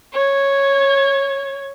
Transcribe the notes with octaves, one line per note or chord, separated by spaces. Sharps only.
C#5 G#6